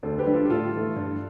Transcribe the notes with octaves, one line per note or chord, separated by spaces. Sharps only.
D2 A4 C5
G4 B4
D3 G3 D4
F4 A4
G4
A2 F4 A4
E3 A3
G2